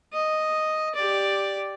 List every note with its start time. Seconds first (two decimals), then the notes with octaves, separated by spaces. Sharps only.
0.13 D#5
0.95 G4 D5